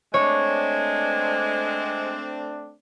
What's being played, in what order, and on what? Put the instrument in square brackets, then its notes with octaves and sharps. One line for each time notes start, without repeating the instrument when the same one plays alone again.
[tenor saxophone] G#3 [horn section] A3 C4 D4 [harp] C#5